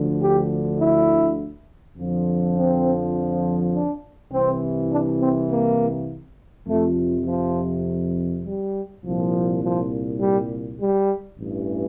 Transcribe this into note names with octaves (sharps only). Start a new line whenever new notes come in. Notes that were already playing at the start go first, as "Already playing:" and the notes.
Already playing: D2 D3 F3
G4
E4
F2 D3 F3
C4
D4
C2 C3 E3 C4
D4
C4
A#3
F2 C3 F3 A3
F3
G3
C2 A#2 F3
F3
G3
G3
A1 G2 E3